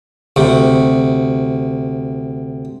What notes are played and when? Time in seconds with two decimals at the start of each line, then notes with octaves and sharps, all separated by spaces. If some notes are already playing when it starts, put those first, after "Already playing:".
0.36 D2 C3